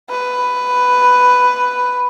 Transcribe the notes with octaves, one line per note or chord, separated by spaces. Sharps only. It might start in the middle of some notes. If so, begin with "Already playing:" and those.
B4